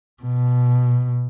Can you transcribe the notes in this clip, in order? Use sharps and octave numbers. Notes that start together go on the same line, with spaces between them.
B2